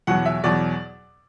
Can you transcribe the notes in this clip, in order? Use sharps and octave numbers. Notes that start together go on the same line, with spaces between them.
E2 B2 F#3 F#5
E5
E2 B2 F#3 D5